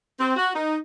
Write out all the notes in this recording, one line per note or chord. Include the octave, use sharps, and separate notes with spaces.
C4
F#4
D#4